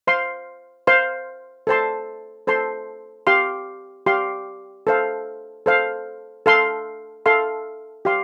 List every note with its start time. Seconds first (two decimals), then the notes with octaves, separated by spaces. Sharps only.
0.07 C5 F5 C6
0.87 C5 F5 C6
1.67 A4 C5 A5 C6
2.47 A4 C5 A5 C6
3.27 G4 F5 C6
4.06 G4 F5 C6
4.87 A4 C5 F5
5.66 A4 C5 F5
6.46 A4 F5 C6
7.26 A4 F5 C6
8.05 G4 F5 C6